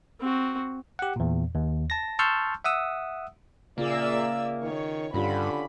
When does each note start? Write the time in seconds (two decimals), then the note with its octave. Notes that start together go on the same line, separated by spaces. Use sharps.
0.20 C4 F#4
0.99 G4 F#5
1.16 E2 A#2
1.55 D#2
1.90 A5 A#6
2.19 A5 C6 C#6 E6 F6 G6
2.64 E5 F#5 D#6 E6
3.78 A#2 C#3 A#3 F4 G#4 D5 E5 E6
4.63 D#3 C#5
5.14 G2 D3 C#4 F4 G4 B5